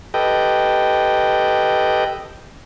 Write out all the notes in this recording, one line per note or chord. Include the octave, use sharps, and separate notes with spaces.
G4 A4 B4 D#5 G5